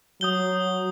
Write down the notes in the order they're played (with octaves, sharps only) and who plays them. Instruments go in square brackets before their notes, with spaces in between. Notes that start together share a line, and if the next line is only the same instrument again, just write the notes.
[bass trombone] F#3 [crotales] D#6 G6 G7